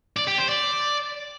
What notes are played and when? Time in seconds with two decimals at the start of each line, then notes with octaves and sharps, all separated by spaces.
0.17 D5
0.27 G4
0.38 C5
0.49 D5